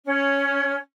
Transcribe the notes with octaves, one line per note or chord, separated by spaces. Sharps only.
C#4